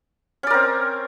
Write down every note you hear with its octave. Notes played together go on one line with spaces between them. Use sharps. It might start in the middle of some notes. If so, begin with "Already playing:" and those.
C4 C#4 A#4 D5